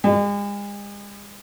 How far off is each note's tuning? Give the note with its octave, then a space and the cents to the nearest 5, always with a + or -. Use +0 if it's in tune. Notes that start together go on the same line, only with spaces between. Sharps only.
G#3 -40